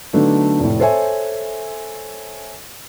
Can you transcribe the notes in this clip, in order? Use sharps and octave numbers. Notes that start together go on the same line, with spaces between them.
D3 F#3 A3 B3 D4 D#4
F1 A2
A4 C5 C#5 E5 G#5